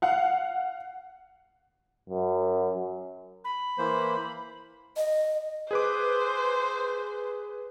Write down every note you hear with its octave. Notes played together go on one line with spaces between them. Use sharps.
F5 F#5
F#2
B5
E3 A#3 C5
D#5
G#4 B4 C5 D6